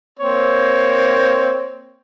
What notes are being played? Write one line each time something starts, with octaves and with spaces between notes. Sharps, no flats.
A#3 C4 C#5